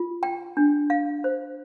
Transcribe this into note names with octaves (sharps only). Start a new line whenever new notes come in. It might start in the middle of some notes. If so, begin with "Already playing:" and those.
Already playing: F4
G5
D4
F5
C5